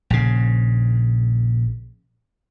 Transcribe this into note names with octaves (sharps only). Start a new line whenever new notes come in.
A#1 C#3